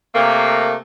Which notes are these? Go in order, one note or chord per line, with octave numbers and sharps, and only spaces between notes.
C3 A3 A#3